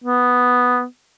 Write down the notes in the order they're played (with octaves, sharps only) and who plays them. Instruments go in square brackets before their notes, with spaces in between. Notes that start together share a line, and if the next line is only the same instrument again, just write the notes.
[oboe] B3